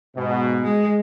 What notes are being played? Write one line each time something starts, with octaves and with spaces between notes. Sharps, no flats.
G#2 B2
G#3